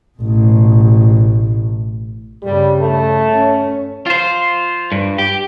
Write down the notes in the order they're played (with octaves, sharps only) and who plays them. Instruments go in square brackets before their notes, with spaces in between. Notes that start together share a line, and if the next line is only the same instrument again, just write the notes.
[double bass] A1 B2
[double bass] G2 C#3 [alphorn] G3
[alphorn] A3
[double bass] C#4
[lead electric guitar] F4 C5
G2
G4